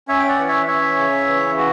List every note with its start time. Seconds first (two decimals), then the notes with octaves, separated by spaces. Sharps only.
0.08 C#4 C#5 E5
0.19 G5
0.28 D5 F#5
0.38 E3
0.48 C#5 E5
0.68 C#4 C#5 E5
0.98 C#3
1.28 E3
1.57 F#4